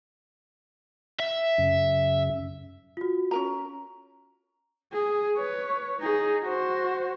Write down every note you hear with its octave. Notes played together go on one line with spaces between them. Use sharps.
E5
F#2 C#3
F4 F#4
C#4 A#4 A#5
G#4
B4 C#5
D#4 G#4
F#4 C5